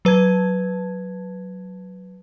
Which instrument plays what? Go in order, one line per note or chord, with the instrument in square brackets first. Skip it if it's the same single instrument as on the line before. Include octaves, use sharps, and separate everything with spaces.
[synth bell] F#3 B4 A5 G#6